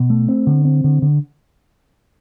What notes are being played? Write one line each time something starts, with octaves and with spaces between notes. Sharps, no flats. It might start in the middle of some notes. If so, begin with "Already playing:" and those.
Already playing: B2
A3
C4
D3
C4
D3
D3